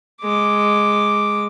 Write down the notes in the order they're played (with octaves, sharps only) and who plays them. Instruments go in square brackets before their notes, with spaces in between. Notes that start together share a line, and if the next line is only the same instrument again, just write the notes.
[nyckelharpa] G#3 D6